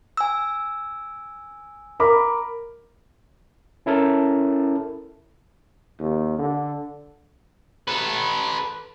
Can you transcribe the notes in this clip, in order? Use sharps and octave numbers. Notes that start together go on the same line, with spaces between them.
G#5 E6
A#4 B5 D6
C#4 E4 A4 A#4 A5
D#2
D3
A4 B4